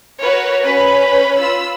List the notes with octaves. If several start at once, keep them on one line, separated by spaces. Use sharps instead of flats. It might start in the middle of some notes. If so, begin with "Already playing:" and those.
F#4 A#4 B4 C#5
C#4 B4 B5
F4 B5 E6